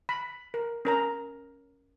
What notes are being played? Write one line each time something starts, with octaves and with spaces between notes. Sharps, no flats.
B5
A#4
C#4 A#4 A#5